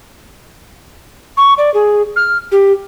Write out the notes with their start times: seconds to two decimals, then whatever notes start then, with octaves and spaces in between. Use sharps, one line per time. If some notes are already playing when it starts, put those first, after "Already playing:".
1.37 C#6
1.58 D5
1.74 G#4
2.16 F6
2.52 G4